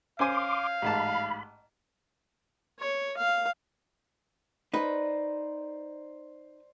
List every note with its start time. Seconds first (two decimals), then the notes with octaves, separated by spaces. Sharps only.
0.19 C#4 C5 F5 G#5 C6 D6
0.82 A1 G#2 A5 B5
2.79 C#5
3.17 F5
4.74 D#4 B4 C5 D5